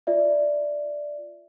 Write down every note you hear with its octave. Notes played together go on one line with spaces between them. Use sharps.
F4 D5 E5